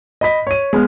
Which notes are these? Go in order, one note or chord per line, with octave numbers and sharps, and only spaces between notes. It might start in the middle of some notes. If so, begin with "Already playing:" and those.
D#5 B5 B6
C#5 D#7
G#3 B3 F6